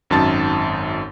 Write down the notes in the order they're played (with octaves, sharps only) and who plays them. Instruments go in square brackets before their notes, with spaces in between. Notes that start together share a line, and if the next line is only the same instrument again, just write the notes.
[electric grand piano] G#1 F#2 D#4 A5 A6